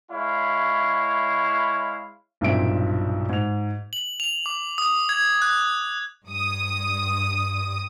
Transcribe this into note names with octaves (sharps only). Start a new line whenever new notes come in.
G#3 E4 C#5 F5
B1 G2 A#2 C4 E5 D7
G#2 F7
F#7
F7
D6
D#6
G#6
F#6
G2 D#6